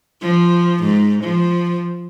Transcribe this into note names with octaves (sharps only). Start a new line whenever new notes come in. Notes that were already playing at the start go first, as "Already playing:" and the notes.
F3
G#2
F3